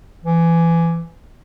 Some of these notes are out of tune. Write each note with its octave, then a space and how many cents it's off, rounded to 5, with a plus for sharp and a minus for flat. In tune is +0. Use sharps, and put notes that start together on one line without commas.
E3 +25